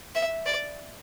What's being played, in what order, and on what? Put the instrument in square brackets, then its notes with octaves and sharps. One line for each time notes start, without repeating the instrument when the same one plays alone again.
[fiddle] E5
D5